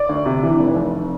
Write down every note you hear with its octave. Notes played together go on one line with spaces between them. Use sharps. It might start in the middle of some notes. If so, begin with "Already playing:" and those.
Already playing: D5
D2
C3
E3
F1
F1